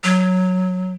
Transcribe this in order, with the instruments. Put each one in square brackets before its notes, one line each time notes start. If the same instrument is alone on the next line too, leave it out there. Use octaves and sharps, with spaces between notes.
[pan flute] F#3